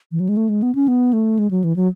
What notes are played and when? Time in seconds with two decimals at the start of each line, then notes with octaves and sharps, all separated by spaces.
0.12 E3
0.20 F#3
0.29 G#3
0.37 A3
0.49 G#3
0.63 B3
0.75 C#4
0.88 B3
1.13 A3
1.39 G#3
1.51 F#3
1.64 E3
1.76 F#3